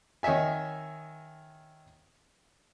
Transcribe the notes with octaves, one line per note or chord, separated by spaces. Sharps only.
D#3 C#5 D#5 E5 G#5